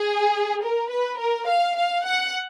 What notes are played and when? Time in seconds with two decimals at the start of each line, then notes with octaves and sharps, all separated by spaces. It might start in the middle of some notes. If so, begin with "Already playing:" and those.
Already playing: G#4
0.62 A#4
0.90 B4
1.18 A#4
1.47 F5
1.76 F5
2.04 F#5